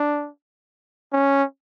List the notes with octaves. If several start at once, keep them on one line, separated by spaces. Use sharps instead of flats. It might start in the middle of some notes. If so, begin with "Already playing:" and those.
Already playing: D4
C#4